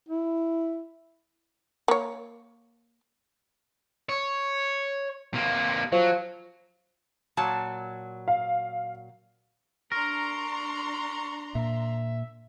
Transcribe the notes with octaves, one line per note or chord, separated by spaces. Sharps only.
E4
A#3 C#5
C#5
C3 A#3
F3 F#3
A#2 F#3 A5
F5
D4 A#4 A#5 C6 C#6
A#2 E5